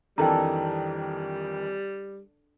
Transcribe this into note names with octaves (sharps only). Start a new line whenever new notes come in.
F2 D#3 E3 G3 D4 A4 G5 A#5